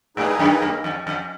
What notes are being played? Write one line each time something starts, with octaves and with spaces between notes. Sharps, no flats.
G#2 G3 A#3 D#4 G#4 B4
F#2
G2
F2
F2